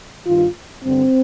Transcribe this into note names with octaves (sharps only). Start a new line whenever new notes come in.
G2 D#3 F4
G2 D3 C4